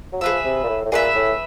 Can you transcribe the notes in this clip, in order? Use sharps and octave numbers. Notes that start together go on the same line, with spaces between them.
F#3
F3 G#4 B4 E5
C3
A#2
A2
A2
A#2 G#4 B4 E5
A2